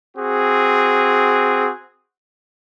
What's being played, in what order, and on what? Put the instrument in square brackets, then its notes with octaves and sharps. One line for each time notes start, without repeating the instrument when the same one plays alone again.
[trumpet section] C4 F#4 G#4